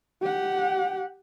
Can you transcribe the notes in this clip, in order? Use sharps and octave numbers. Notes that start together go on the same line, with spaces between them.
G4 F#5